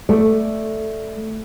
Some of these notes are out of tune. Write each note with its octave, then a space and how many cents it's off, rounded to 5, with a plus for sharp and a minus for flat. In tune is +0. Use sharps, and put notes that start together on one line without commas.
A3 +0 D5 +5